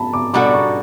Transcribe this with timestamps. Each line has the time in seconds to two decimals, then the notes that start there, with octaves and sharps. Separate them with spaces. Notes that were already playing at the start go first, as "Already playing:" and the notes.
Already playing: A5 B5
0.13 D6
0.34 B2 G3 D4 F#4 A4 D6
0.46 D6
0.54 C#6